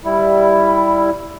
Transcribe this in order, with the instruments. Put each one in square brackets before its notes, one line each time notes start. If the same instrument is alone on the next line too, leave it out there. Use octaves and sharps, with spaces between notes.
[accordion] G3 E4